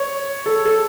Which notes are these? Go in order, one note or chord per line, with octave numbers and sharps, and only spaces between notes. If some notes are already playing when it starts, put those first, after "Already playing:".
Already playing: C#5
A4
A4